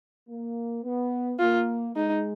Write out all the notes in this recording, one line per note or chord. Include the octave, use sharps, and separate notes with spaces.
A#3
B3
A#3 F4
G#3 D#4